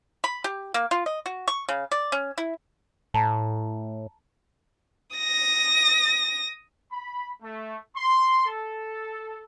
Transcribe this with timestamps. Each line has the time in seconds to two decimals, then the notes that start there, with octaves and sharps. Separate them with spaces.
0.24 B5
0.44 G4
0.74 A#3
0.91 F4
1.06 D#5
1.26 F#4
1.48 C#6
1.69 C#3
1.91 D5
2.12 C#4
2.38 E4
3.14 A2 A5 A#5
5.16 D#6 A#6
6.92 B5
7.43 A3
7.96 C6
8.46 A4